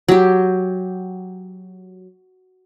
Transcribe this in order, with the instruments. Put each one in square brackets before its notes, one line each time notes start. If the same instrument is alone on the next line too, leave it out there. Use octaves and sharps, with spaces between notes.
[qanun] F#3 G4